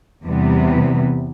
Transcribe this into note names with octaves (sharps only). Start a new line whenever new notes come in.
E2 C3 E3 G3 B3